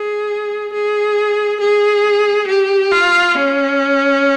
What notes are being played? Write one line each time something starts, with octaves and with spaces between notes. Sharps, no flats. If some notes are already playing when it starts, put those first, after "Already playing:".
Already playing: G#4
G#4
G#4
G4
F4
C#4